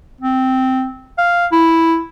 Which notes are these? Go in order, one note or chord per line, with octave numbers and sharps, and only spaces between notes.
C4
F5
E4